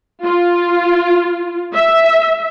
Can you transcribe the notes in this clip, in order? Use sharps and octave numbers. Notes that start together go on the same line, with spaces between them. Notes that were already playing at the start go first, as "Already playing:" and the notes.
F4
E5